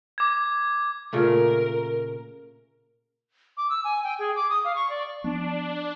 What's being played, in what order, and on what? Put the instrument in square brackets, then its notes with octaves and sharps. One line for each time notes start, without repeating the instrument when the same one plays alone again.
[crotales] D6 G#6
[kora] A#2 C#3 A3 [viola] A#4
[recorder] D6
E6
G#5
G5
G#4
D6
D#6
F5
C#6
D5
[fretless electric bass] F3 B3 [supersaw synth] D4